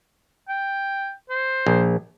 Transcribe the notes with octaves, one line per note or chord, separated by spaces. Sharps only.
G5
C5
A#1